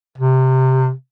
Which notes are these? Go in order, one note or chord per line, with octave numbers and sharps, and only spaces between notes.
C3